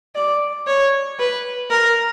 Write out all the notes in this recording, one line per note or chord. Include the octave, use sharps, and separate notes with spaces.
D5
C#5
B4
A#4